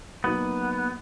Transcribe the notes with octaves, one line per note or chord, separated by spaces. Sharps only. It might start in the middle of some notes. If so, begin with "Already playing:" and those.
F#3 A#3 B3 D#4 F#4